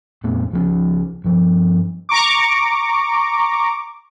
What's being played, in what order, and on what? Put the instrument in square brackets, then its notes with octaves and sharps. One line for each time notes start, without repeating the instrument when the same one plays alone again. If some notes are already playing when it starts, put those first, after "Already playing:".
[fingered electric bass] F2 A#2 A3 B3
C#2 F3 F#3 C#4
G2 F3
[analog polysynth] A#5 C#6 D6